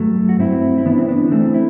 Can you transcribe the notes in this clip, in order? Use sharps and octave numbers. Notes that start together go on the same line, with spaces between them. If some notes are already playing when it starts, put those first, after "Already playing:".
Already playing: G2 F#3 A3
F#4
G2 C4 E4
E4
E3 B3 D4
C4
B3 D4
E3 A3 C4
E4